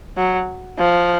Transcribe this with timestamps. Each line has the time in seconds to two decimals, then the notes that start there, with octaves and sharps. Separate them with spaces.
0.17 F#3
0.79 F3